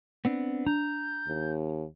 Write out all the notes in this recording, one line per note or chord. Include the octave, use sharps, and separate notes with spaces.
B3 C4 D4
D4 A#5 G6
D#2